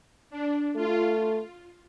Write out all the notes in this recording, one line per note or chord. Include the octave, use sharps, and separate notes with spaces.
D4
A3 F4